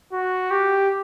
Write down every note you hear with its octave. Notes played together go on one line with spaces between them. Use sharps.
F#4
G4